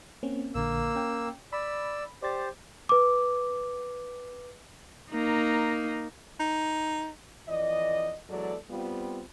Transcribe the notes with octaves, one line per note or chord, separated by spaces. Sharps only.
A#3 C4 C#4
A#1 D3 A#3 E6
C#4 G5
D5 B5 E6
G4 C5 D5 A6
B4 D6
A#3 D#4
D#4
F2 E3 D5 D#5
E2 F#3 G#3 A4 D5
G3 B3 C4 F4